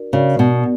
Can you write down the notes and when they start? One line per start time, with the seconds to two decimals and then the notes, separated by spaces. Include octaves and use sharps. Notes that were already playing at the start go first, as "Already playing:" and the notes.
Already playing: D4 F#4 A#4 D5
0.13 C#3 D4 F#4 A#4 D5
0.39 B2